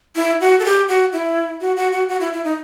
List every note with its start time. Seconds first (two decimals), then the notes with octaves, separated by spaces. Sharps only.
0.16 E4
0.41 F#4
0.60 A4
0.65 G4
0.88 F#4
1.13 E4
1.61 F#4
1.77 F#4
1.92 F#4
2.09 F#4
2.20 E4
2.33 E4
2.44 D#4